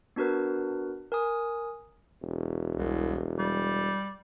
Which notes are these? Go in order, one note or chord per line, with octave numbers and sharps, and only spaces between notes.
B3 D4 F#4 A#4 B4
A#4 G#5 D#6
E1
C2
G3